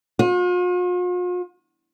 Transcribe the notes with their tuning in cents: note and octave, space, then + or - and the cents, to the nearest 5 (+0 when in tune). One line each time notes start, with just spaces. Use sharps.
F4 +45